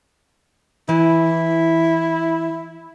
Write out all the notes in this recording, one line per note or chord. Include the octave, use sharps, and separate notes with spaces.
E3 E4